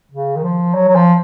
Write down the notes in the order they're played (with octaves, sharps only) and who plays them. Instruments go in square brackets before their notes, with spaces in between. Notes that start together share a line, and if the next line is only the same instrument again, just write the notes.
[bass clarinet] C#3
D#3
F3
F#3
F#3
F3